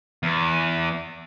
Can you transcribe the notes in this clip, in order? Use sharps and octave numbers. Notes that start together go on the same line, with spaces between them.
E2